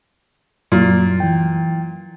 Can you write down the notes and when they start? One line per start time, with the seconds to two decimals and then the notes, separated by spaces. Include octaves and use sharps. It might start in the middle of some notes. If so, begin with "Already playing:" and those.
0.72 F#2 A#2 F#3
1.20 E3 G5